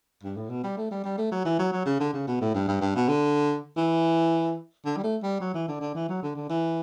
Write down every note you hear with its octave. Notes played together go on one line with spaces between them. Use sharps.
G2
A2
B2
G3
A3
G3
G3
A3
F#3
E3
F#3
F#3
C#3
D3
C#3
B2
A2
G2
G2
G2
B2
D3
E3
D3
G3
A3
G3
F#3
E3
D3
D3
E3
F#3
D3
D3
E3